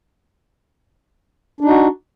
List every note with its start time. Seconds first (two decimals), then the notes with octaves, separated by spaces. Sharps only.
1.61 D4
1.65 D#4
1.69 F#4